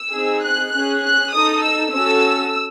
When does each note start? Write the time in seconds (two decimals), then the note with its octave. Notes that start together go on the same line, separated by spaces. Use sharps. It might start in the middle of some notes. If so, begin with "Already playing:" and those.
Already playing: E6
0.13 C4 D#4 G#4
0.43 F#6
0.73 C#4 G#4 F#6
1.03 F#6
1.33 D#4 A4 D#6
1.64 E6
1.93 C#4 F#4 A4 E6